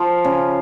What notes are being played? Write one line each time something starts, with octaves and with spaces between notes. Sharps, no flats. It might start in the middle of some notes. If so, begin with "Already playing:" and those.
Already playing: F3 F4 F5
C#3